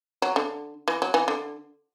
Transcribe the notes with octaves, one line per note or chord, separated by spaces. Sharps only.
F#3
D3
E3
F#3
E3
D3